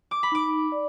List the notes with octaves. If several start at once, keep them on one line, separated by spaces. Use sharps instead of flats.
D6
B5
D#4 D6
D5